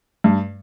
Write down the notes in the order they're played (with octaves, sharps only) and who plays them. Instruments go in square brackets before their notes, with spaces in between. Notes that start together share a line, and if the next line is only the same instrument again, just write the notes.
[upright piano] G2